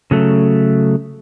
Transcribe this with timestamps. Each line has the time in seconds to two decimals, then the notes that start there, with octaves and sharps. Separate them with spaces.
0.11 C#3 F#3 A3